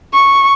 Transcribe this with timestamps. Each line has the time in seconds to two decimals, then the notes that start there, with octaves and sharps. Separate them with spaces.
0.13 C#6